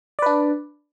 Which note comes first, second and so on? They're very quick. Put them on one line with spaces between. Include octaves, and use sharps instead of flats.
D5 B4 D4